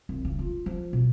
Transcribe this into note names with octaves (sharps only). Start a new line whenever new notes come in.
C2
C#3
F4
F3
B2